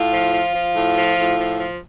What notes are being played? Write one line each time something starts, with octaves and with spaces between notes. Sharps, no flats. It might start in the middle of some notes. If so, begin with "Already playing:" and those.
Already playing: A2 F4
F3
F3
F3
A2
F3
A2
F3
F3